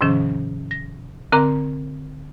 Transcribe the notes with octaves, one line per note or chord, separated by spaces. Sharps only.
G#2 C3 D#3 F3 C#4
A#6
D3 C4 A#4 A#5 D6